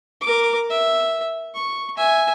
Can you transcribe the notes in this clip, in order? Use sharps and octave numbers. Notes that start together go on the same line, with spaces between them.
A#4 D6
E5
C#6
E5 G#5